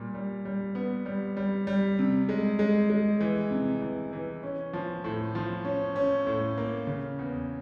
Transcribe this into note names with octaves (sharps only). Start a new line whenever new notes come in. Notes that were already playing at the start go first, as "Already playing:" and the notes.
Already playing: A#2 G3
G3
G3
B3
G3
G3
G3
C3
G#3
G#3
G#3
E3
C3
E3
E3
C#4
F3
A2
F3
C#4
C#4
A2
A#3
C#3
E2